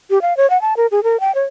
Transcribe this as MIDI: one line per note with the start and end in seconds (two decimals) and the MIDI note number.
0.10 0.21 67
0.22 0.36 77
0.37 0.49 73
0.50 0.60 78
0.61 0.74 81
0.77 0.87 70
0.91 1.03 68
1.03 1.20 70
1.20 1.34 79
1.35 1.45 73